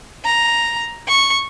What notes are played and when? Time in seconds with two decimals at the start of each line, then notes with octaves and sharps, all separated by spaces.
0.25 A#5
1.07 C#6